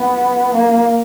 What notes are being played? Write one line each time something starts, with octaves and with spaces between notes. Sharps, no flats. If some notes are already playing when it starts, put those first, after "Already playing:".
Already playing: B3
A#3